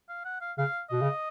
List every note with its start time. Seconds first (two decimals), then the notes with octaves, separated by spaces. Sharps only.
0.09 F5
0.25 F#5
0.41 F5
0.58 C#3 F5
0.90 B2 D#5
1.02 C#3